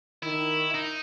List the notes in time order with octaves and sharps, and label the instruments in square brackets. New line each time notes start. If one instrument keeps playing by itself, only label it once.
[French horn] D#3 [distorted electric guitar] E4
[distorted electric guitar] D#4